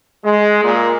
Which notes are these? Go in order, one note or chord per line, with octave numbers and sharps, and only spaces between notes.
G#3
A#2